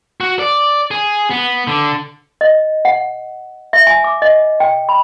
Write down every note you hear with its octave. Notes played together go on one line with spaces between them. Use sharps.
F#4
D5
G#4
B3
D3
D#5
F#5
E5
G#5
D6
D#5
G5
B5